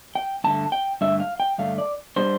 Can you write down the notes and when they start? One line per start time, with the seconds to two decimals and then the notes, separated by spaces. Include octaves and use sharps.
0.15 G5
0.44 G2 D3 A3 A5
0.72 G5
1.01 G2 D3 A3 E5
1.20 F5
1.40 G5
1.58 G2 D3 A3 F5
1.78 D5
2.16 B2 G3 D4 C5